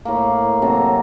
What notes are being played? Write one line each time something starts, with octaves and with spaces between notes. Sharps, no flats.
A2 A#3
C3 F#3 A#3 A4